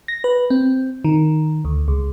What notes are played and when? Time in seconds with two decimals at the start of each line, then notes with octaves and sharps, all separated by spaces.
0.08 A#6
0.24 B4
0.50 C4
1.04 D#3
1.65 D2
1.88 C#2